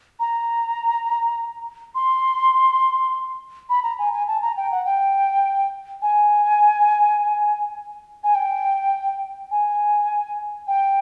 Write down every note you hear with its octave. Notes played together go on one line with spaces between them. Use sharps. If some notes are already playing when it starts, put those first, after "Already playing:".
A#5
C6
B5
A#5
G#5
G#5
A5
A#5
G5
F#5
G5
G#5
G#5
G5
G#5
G5